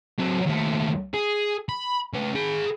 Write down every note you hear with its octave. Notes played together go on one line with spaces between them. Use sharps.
F#3 C4
D#2 A3
G#4
B5
C#3 B4
G#4 B5